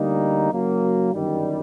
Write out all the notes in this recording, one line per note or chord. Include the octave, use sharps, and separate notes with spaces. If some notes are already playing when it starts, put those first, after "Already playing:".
Already playing: D2 D3 G3 A#3 D#4
F#1 F#2 F#3 A#3 F#4
G1 F#2 D#3 G3